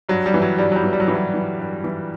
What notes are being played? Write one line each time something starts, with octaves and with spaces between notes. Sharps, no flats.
G2 F#3
G3
E3
F#3
G2 G3
F#3
G3
E3
G3
F#3
G2 E3
F#3
E3
G2
E3